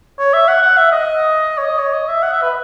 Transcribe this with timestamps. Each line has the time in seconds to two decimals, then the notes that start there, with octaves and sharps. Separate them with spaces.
0.19 C#5
0.34 E5
0.48 F#5
0.62 F#5
0.77 E5
0.92 D#5
1.58 C#5
1.65 D#5
1.79 C#5
1.94 D#5
2.08 E5
2.23 F#5
2.33 E5
2.42 B4